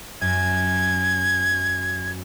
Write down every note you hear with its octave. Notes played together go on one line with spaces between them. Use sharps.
F#2 G#6